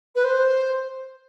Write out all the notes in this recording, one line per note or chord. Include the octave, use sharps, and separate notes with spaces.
B4
C5